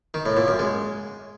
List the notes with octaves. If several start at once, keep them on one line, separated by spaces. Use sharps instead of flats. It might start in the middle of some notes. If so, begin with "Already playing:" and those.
D#3
A2
A#2
F#2
G#3